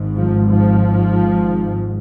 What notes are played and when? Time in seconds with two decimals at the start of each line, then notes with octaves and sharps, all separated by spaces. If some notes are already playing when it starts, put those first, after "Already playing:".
Already playing: G#1 G#2
0.16 F3
0.50 F3